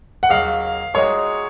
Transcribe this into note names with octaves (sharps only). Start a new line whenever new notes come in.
F#5
D#2 C#3 F#3 F5
A#2 G#3 D#4 F#4 C#5